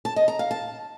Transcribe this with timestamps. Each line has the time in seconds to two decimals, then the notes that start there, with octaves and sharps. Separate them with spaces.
0.05 A5
0.16 D#5
0.28 A#5
0.39 F5
0.51 A5